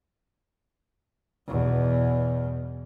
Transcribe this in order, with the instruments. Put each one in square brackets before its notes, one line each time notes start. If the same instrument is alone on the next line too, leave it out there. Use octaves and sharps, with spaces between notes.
[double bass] E2 B2